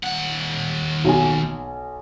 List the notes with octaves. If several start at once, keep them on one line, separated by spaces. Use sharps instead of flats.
D#2 F#5
B1 G#5